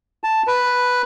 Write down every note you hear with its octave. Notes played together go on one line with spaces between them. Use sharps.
A5
B4